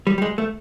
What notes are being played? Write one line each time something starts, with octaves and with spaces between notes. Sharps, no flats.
G3
G3
G#3
A3